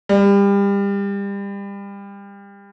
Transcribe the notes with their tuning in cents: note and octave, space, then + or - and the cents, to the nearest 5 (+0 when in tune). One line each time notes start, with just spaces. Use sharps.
G3 +30